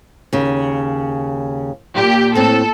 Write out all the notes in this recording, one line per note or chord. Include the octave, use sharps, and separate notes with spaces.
D#2 C#3
A#2 G4
A2 C4 A4